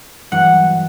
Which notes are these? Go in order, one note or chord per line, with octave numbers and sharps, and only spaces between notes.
G2 E3 F#3 F#5